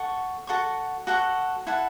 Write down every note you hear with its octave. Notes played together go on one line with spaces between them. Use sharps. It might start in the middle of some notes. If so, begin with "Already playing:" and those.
Already playing: A4 F#5 C#6
F#4 A4 F#5 C#6
F#4 A4 F#5 C#6
E4 A4 F#5